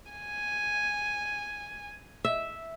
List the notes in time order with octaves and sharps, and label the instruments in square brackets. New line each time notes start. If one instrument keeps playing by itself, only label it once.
[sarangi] G#5
[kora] E5